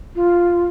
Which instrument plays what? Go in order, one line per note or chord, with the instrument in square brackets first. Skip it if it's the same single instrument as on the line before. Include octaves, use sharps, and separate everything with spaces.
[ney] F4